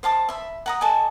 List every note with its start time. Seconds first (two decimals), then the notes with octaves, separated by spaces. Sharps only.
0.03 C5 F5 A5 D6
0.29 E5 B5
0.66 F#5 A#5 D#6
0.81 A4 D#5 G#5 D6